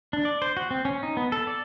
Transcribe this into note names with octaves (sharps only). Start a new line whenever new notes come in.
D4
D5
C5
F#4
C4
C#4
D#4
B3
A4
D5